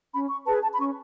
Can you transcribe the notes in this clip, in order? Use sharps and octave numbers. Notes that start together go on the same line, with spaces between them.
C#4 B5
C#6
G#4 B4 A5
A5
B5
C#4 C#6